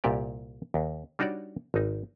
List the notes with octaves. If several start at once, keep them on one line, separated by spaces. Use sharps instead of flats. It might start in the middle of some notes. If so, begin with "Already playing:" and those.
C2 A#2 G4 D5
D#2
G3 D4 D#4 F#4 C#5 D5
G#1 D#4